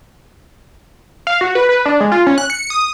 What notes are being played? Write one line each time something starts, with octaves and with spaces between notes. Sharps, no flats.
F5
F#4
B4
B4
D4
G#3
F4
C#4
F#6
C#7
D#6